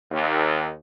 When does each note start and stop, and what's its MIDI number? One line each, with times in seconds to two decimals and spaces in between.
0.12 0.70 39